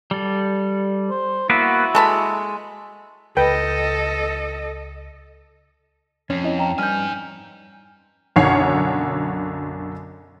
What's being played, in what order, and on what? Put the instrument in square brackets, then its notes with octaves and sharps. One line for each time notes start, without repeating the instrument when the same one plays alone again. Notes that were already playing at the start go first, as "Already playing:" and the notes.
[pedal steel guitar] G3 A4
[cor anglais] C5
[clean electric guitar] A#3 B3 B4 [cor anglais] E4 [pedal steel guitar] F#4
[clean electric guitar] G#3 [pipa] A4 A5 B5
[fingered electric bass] C#2 [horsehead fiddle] A4 D#5 [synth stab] B4 G5
[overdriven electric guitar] F2 [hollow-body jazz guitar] C#4
[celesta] E4 D#5
G5 A#5
[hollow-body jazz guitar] G2 [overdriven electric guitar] D#4 G#5 [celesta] F6 G6
[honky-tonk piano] B1 F#2 D3 C#5 F#5 C7